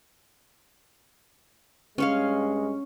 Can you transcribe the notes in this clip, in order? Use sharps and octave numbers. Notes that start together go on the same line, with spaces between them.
G2 G#3 C#4 C#5 F5